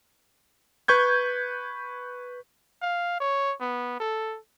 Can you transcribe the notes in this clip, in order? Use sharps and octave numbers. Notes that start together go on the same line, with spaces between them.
B4 C#6 G6 G#6
F5
C#5
B3
A4